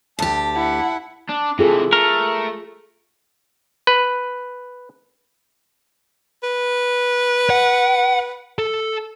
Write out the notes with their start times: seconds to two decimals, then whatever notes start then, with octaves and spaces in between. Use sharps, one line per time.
0.19 D2 G4 A5
0.56 E4 F#5
1.29 D4
1.59 C3 E3 F4 G#4 A4
1.93 A3 A#4
3.87 B4
6.43 B4
7.50 F#5
8.58 A4